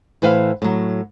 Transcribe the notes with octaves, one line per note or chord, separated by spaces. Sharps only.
A2 E3 B4 C5 E5 F5
A2 F#3